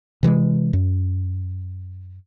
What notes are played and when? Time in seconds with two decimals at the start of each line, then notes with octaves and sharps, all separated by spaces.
0.23 C3 E3 G3 G#3
0.73 F#2